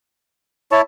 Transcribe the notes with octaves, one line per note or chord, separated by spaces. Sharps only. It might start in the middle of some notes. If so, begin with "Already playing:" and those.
E4 C#5 A5